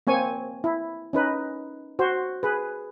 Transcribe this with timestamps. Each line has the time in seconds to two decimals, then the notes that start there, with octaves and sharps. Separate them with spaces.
0.07 A#3 C4 C#5 G#5
0.64 E4
1.13 C#4 D#4 B4
1.99 F#4 C5
2.43 G#4 B4